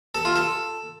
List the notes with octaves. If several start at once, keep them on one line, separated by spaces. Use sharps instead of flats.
A4
F4
A4